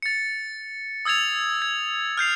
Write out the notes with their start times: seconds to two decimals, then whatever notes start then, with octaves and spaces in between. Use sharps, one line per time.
0.02 A6 C#7
1.05 D#6 E6 G#6 A6 F7
1.62 G#6
2.17 F6 G6 C7 F7